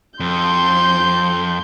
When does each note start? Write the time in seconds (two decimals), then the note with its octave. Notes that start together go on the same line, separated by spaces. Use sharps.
0.20 F2 C6 G6